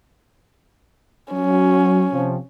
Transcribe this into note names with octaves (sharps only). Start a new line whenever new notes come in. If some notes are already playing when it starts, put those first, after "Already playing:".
F#3 C#4
C3 F3 C4